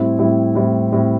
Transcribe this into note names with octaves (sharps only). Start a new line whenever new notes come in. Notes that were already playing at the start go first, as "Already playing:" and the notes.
Already playing: A2 G3 C4 E4
A2 G3 C4 E4
A2 G3 C4 E4
A2 G3 C4 E4